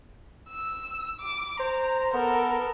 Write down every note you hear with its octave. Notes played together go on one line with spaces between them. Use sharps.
E6
D6
C5 A#5
B3 A4 A#4